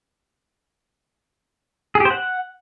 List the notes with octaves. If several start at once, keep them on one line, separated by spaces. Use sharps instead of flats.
G#4
G4
C5
F#5